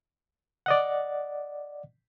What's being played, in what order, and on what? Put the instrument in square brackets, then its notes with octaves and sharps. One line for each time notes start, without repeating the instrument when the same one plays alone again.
[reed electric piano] D5 D#5 F#5